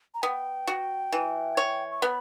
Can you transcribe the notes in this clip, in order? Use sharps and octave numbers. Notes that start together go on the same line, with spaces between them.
A#5
B3 G5
F#4
E3
C#5
C#6
B3 B5